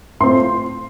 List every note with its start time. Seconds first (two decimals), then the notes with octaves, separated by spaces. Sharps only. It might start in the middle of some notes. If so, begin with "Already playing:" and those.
0.20 A2 A3 C4 F4 C6